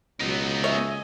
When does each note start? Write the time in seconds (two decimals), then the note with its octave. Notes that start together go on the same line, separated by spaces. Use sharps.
0.20 C#2 B2 F#3 B3 D#4
0.64 C#5 D#5 E5 G#5